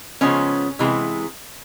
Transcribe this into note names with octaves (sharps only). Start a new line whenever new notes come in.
C#3 F3 G#3 B3 C#4
C3 E3 G#3 B3